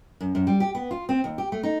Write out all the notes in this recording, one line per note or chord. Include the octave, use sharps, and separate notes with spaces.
F#2
F#2
G3
G4
B3
F4
C4
D#2
G4
A3
D#4